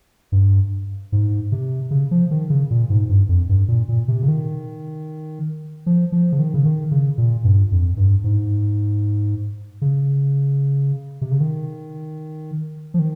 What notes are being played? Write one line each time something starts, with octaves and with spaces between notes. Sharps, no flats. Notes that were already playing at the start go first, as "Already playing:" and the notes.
G2
G#2
C3
C#3
F3
D#3
C#3
A#2
G#2
G2
F2
G2
A#2
A#2
C3
C#3
D#3
F3
F3
C#3
D#3
C#3
D#3
C#3
A#2
G2
F2
G2
G#2
C#3
C3
C#3
D#3
F3
D#3